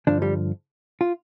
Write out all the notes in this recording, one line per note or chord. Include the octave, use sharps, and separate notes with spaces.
G2 D3 F3 D4
G3
F4